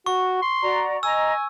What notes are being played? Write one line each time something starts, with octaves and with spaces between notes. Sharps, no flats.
F#4 C#6
C6
F#4 D5 A#5
D#5 G#5 A#5 E6